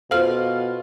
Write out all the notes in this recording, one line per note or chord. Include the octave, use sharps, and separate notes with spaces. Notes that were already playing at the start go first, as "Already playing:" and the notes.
B2 F4 A4 C5 F5 F6